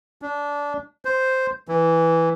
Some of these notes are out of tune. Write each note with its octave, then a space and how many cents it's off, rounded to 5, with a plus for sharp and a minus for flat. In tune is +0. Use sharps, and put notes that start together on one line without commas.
D4 -20
C5 -5
E3 +0